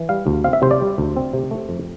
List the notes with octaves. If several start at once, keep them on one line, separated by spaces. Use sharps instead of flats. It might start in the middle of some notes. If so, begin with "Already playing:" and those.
Already playing: E3
G3 F5
D2
C4 F5
E5
C3 C5
D5
G3
D2
C4
C3
A3
F2